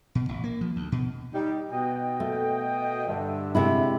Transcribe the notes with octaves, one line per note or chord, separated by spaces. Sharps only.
B2
A1
A#3
F3
D2
B2
G3 D#4
B2 D#5 G5
A3
G2 D3 E5
C3 G#3 E4